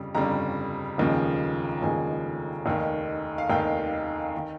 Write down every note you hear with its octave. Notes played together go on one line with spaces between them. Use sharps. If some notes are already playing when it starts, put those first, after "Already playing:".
Already playing: G1 F2 C#3 G3
G1 F2 C#3 G3 A#5
F1 D#2 C#3 F3 G#3
F1 D#2 C#3 F3 G#3 G#5
F1 D#2 D#3
F5
F1 D#2 D#3 G5
D#3